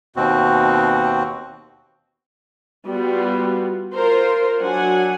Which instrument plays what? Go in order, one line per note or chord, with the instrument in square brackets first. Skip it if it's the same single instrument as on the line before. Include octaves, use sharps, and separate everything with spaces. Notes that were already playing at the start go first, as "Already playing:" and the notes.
[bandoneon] D#2 B2 C4 F#4
[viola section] G3 B3 F4 F#4
F4 A#4 C5
F#3 D4 F#5 G#5